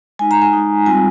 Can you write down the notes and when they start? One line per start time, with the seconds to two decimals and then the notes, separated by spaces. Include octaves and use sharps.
0.19 G#3 D#4 G#5
0.31 A#5
0.42 G#5
0.53 G#3 D#4
0.86 G3 C4 F4 G#5